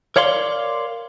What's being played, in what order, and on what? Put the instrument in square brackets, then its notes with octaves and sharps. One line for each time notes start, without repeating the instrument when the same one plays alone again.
[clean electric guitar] A#4 C#5 D5 F5 C6